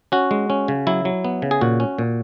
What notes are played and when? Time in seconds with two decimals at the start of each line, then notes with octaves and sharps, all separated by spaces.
0.12 C#4 F#4
0.31 G#3
0.50 C#4
0.68 C#3
0.87 F#3 E4
1.05 F#3
1.25 B3
1.42 C#3
1.51 G#4
1.61 A#2 F#4
1.80 C#4
1.98 A#2